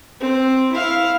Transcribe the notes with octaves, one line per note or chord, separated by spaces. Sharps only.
C4
E4 F5